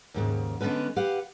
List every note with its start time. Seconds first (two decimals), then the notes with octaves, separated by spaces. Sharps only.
0.14 D#2 G#2 C#3
0.61 D3 G#3 B3 C#4 B4
0.96 G4 B4 F5 F#5